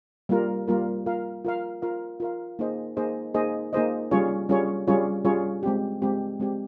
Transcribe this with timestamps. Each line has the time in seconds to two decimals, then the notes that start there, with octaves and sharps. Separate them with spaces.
0.29 G3 A#3 F4 A#4
0.68 G3 A#3 F4 A#4
1.06 F4 A#4 F5
1.45 F4 A#4 F5
1.82 F4 A#4 F5
2.20 F4 A#4 F5
2.59 A#3 D#4 G#4 C5 D#5
2.97 A#3 D#4 G#4 C5 D#5
3.34 A#3 D#4 G#4 C5 D#5
3.73 A#3 D#4 G#4 C5 D#5
4.11 G3 C#4 F4 G#4 C#5
4.49 G3 C#4 F4 G#4 C#5
4.87 G3 C#4 F4 G#4 C#5
5.25 G3 C#4 F4 G#4 C#5
5.63 G#3 C4 G4
6.02 G#3 C4 G4
6.40 G#3 C4 G4